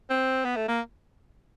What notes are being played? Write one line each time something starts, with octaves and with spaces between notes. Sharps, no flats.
C4
B3
A3
A#3